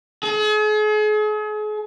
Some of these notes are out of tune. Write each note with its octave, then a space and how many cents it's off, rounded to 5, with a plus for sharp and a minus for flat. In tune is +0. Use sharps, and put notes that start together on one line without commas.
G#4 +40